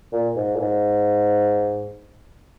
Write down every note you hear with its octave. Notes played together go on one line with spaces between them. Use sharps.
A#2
G#2
A#2
G#2